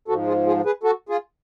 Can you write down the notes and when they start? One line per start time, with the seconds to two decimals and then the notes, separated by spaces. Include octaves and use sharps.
0.08 G#2 F3 F#4 A4
0.27 F4 G#4
0.47 F4 G#4
0.65 G#4 B4
0.83 F#4 A4
1.09 F4 G#4